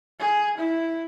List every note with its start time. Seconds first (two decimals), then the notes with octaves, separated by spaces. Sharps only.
0.19 G#4
0.57 E4